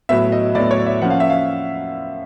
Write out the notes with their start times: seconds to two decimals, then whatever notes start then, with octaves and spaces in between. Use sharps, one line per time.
0.09 A2 F#3 B3 E5
0.32 D#5
0.55 A2 F#3 B3 D5
0.71 C#5
0.86 E5
1.02 F3 A#3 C#4 F#5
1.10 F5
1.20 E5
1.30 F5